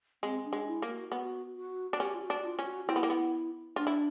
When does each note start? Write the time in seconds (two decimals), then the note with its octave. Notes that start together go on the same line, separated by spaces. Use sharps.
0.23 G#3 C4
0.45 D4
0.53 G#3
0.67 E4
0.82 A#3
0.89 F#4
1.11 B3 F#4
1.56 F#4
1.93 D4
2.00 C#4 G4
2.14 F4
2.22 F#4
2.30 D4
2.44 F4
2.59 C#4
2.66 F#4
2.88 C4 E4
2.96 B3
3.03 A#3
3.10 B3
3.76 D4 F4
3.87 E4